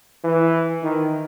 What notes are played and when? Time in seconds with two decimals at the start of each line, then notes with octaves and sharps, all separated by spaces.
0.24 E3
0.83 D#3